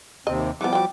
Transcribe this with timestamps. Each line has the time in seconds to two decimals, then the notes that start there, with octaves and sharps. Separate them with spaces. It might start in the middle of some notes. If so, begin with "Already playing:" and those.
0.27 D#2 C3 C4 D#5
0.61 E3 F3 G3 A#3 B3 D6
0.73 F#3 G5